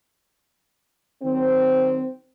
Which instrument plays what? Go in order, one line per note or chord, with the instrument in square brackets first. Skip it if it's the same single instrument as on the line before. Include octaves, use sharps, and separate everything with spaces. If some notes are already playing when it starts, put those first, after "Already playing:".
[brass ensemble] D#3 F#3 C4